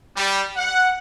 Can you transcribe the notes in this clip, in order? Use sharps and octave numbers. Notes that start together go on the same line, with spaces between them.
G3
F#5